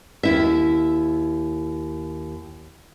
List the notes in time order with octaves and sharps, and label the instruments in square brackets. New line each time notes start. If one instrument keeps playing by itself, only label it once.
[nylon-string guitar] D#2 E4 E5